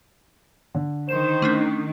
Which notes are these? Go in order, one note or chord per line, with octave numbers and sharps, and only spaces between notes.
D3
D#3 C5 E7
A3 C#4 D4